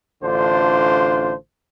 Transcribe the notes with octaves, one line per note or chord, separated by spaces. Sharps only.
A1 D3 D4 F4 C5